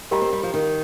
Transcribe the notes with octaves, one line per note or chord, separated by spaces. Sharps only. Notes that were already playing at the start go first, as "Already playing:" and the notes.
G3 G4 A#4 D#5 G5 A#5
C4
G3
F3
D#3